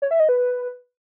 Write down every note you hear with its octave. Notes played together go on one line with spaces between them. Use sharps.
C#5
E5
D#5
B4